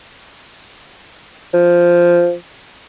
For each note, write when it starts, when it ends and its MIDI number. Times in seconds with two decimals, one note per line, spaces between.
1.53 2.34 53